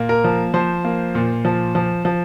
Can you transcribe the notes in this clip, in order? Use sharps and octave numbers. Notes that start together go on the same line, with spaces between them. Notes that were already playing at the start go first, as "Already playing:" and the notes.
Already playing: A#2 A#3
A#4
F3
F3 C5
A#3
A#2
F3
F3
F3